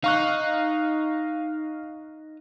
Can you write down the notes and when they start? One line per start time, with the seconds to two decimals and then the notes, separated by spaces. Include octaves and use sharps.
0.04 D#4 F5 C#6 F#6